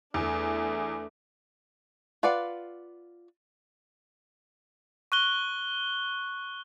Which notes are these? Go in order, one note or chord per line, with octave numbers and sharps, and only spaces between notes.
E2 A3 D4
F4 B4 D5 F5 F#5
C#6 F#6 G7